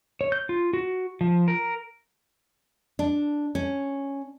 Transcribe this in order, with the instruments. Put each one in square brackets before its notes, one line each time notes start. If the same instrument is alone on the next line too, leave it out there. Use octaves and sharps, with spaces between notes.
[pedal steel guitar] C#5
G6
F4
F#4
F3
A#4
[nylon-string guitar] D4
C#4